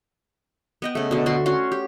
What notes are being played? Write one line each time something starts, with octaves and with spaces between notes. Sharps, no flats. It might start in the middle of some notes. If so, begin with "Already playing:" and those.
B3 D#5 G5
C#3 A3
B2 D3
D3 F#4 C6
C#4 F#4 C6
G4